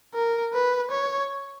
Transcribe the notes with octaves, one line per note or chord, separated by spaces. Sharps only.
A#4
B4
C#5